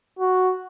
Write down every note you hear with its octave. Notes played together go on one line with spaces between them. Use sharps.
F#4